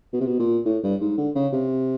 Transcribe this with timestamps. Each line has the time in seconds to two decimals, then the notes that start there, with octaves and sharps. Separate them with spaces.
0.13 B2
0.21 C3
0.27 B2
0.40 A#2
0.65 A2
0.83 G2
1.01 G#2
1.18 D3
1.35 C#3
1.53 C3